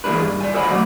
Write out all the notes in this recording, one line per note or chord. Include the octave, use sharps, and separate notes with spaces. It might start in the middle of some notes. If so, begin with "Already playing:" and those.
E3 G#3 A#3 D4 B4
G2
D5 G#5
A4 C5 D#5 F#5 B5
B1 F#3 A3 D5